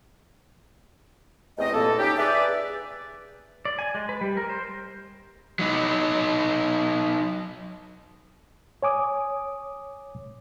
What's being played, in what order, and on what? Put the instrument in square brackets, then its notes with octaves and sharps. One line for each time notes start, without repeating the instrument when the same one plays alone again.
[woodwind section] E2 C3 A3 C4 D#5
E2 G2 A#2 A#3 A4
C#4 D#4 G4
G#4 B4 D5 E5
[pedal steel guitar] D5
G#5
G#3
B4
G3
A#4
C5
[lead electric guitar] F#3 D#4
[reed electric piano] C#5 G#5 D6 D#6